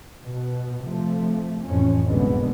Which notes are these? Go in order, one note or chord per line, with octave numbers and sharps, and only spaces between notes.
B2
C3 F3 A3
A1 F2 C#4
F#1 C2 B2 D3 G#3 B3